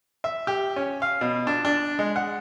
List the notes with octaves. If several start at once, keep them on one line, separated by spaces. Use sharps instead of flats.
E5
G4
C#4
F5
B2
D4
D4
G#3
F#5